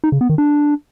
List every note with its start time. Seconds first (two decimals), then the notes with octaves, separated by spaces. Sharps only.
0.04 D#4
0.12 C#3
0.21 B3
0.29 D#3
0.38 D4